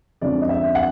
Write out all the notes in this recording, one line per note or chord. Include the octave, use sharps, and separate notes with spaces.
F2 D3 F3 G#3 C#4 D5
D#5
E5
F#5